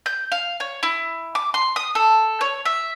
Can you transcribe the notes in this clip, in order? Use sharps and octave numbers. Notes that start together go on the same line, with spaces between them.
G6
F5
C#5
E4
D6
C6
D#6
A4
C#5
E5